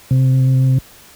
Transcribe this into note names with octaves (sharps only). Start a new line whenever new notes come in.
C3